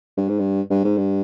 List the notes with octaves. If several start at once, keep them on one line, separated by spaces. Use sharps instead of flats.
G2
G#2
G2
G2
G#2
G2